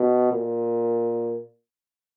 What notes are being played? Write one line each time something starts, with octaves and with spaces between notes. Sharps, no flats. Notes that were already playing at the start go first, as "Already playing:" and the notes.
Already playing: B2
A#2